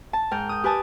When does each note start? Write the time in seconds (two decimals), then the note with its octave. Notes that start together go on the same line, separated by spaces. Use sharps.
0.13 A5
0.31 G#2 A#4 G5 G6
0.49 D#6 G6
0.64 G4 B4 G#5 A5 D#6